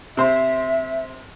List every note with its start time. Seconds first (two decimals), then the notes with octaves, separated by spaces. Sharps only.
0.17 C3 C5 E5